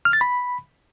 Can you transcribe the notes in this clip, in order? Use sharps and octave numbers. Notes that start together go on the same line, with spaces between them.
F6
A6
B5